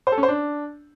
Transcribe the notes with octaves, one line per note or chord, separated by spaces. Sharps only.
C5
A4
C#4
C5
D4